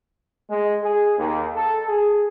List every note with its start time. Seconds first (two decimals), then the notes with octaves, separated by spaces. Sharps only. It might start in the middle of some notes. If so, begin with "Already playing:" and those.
0.50 G#3
0.83 G#4
1.18 D#2
1.56 A4
1.89 G#4